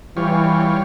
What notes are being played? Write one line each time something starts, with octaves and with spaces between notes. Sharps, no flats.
E3 G3 F4 C#5